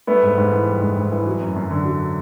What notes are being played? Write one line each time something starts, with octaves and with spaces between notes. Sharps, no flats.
G3 A3 B3
G#2
G#2
E3
G3
G#2
G#2
E3
F#3
F#2
F#2
D3
F#3